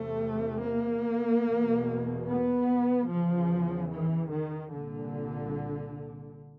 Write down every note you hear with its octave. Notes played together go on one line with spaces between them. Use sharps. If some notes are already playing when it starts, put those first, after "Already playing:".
Already playing: E2 C3 A3
A#3
E2 B2
B3
E2 C#3 F3
E3
D#3
C2 A#2 D3